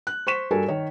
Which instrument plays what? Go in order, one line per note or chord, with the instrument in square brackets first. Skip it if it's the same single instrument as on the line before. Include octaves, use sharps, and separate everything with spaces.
[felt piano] F#6
C5 C#6 B6 E7
G2 F#4 A4 A#4 G#5
D#3 C#5